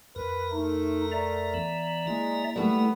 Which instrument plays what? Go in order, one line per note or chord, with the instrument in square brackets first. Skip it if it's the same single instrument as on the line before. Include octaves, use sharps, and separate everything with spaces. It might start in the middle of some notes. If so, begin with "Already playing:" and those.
[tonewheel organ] F2 A#4 [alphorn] B4
[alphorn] A3 [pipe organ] D#4
[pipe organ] D5 E5 A#5
[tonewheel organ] E3 B3
[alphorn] G#3 [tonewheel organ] A#3 E4
[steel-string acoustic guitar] G3 A3 [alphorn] B3